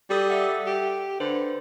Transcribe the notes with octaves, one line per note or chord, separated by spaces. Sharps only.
G3 G4 A4 D#6
A4 E5 F#5
G4
D3 B4 C5